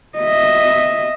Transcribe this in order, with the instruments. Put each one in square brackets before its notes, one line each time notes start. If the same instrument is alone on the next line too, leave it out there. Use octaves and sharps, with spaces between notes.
[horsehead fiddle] D#5 E5